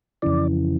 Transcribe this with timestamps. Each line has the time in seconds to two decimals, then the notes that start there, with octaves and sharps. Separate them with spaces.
0.22 F2 C#3 E3 D5